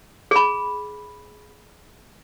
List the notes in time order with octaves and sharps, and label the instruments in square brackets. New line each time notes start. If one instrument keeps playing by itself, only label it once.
[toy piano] G#4 B5